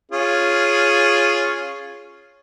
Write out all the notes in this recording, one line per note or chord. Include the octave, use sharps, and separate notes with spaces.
C#4 F4 G#4